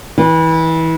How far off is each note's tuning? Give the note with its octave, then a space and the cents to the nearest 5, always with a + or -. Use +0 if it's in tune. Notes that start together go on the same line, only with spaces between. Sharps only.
E3 -25